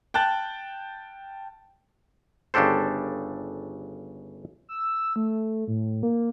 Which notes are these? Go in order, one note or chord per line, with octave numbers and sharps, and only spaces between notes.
G5 A5 F#6 A6
G1 C#3 D4 G4 A4 C5
E6
A3
A2
A#3